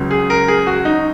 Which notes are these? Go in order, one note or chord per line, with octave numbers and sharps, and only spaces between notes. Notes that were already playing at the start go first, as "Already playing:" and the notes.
Already playing: C#2 C#3 F#3
G#4
A#4
G#4
F#4
D#4